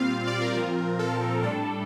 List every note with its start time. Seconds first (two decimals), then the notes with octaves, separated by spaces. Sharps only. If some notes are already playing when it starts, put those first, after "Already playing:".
Already playing: A#2 G3 C4 F4 F5
0.27 D5
0.41 A#4
0.56 A#2 F3 C4 F4
0.99 A4
1.42 A2 G3 D4 A4